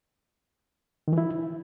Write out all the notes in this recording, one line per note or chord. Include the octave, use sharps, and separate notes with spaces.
D#3
E3
E4